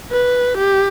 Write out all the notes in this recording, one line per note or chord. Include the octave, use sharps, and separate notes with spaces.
B4
G4